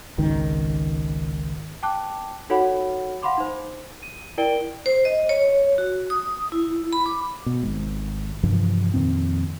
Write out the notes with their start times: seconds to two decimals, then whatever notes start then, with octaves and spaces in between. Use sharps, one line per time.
0.18 G#1 C#2 D#3
1.83 G5 A5 D6 F#6
2.50 D#4 F#4 A4 C#5 F#5 B5
3.23 F5 F#5 B5 C6 D6
3.37 D#4 C5
4.02 D#7
4.38 E4 A#4 D5 G5 D7 G7
4.86 C5
5.05 D#5
5.29 C#5
5.78 F#4
6.10 D#6
6.52 E4
6.93 B5
7.06 D6
7.46 B2
7.63 G#1 G#2
8.43 G2 C3 E3 F3
8.94 F2 A#2 D#3 C4